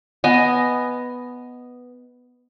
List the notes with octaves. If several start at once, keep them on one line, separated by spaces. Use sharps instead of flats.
B3 D#5 G#5